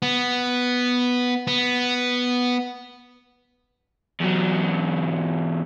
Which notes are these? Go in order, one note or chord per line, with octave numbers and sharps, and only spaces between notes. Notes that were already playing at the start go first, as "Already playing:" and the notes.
B3
B3
E2 F#3